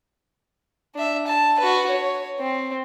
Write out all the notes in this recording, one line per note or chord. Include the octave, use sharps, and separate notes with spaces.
D4 E5
A5
F#4 B4
C#5
C4